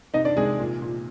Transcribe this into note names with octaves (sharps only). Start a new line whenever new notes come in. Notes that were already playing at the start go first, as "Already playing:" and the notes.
C3 D#4 D#5
D4 D5
C3 G#3 G#4
A#2
A#2